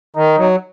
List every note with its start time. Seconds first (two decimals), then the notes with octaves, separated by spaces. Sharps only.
0.16 D#3 D#4
0.38 F#3